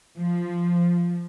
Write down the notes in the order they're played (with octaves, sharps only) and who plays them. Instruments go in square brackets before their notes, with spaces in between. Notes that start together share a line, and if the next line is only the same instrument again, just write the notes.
[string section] F3